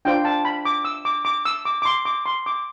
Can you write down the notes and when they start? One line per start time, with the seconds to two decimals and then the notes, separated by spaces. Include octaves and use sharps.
0.05 D4 F4 C5 G5
0.25 A5
0.45 B5
0.65 D6
0.85 E6
1.05 D6
1.25 D6
1.45 E6
1.65 D6
1.82 D6
1.85 C6
2.05 D6
2.26 C6
2.46 D6